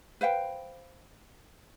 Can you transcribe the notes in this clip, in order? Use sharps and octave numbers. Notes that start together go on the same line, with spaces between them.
B4 C5 F5 G5